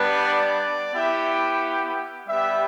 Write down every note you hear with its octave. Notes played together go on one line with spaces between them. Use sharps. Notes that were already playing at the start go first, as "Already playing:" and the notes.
Already playing: G3 B3 D4 B4
D5
B3 E4 G4 E5
G3 B3 G4 E5